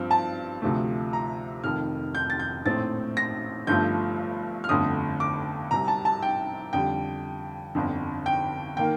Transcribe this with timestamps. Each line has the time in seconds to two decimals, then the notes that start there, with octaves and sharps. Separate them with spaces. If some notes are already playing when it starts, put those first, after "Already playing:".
Already playing: G2 F3 C4
0.11 A5
0.62 D2 C3 F3 A3
1.13 A#5
1.64 F1 F2 D#3 F6
2.15 G6
2.30 A6
2.39 G6
2.65 A#1 A2 A3 C4 A6
3.17 A#6
3.67 G1 G2 F3 A3 G6
4.64 F6
4.69 G1 F2 D3 A3 D#6
5.20 D6
5.71 C2 C3 G3 A#5
5.88 A5
6.05 A5
6.22 G5
6.73 F2 D3 G3 G5
7.75 G1 F2 D3
8.26 G5
8.77 D#3 A#3 G5